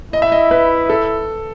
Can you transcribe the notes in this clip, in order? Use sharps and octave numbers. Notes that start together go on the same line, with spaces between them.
E4 D#5
E5
D#5
B4
A4